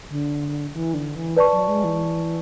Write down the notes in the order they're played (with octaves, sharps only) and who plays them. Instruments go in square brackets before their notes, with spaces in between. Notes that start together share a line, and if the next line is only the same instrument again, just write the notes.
[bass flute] D3
E3
D3
E3
[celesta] B4 D5 A5 C#6
[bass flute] F#3
G#3
E3